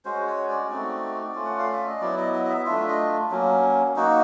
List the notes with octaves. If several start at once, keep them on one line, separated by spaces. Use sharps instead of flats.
G#3 C#4 F#4 C5
C#5
D5
A3 C4 D#4 F#4
A3 C#4 F4
F#5
F5
E5
D#5
F#3 B3 E4 D5
D#5
D#5
D#5
E5
A3 D4 F4 E5
D#5
F#3 A#3 C#4
A#3 D#4 F#4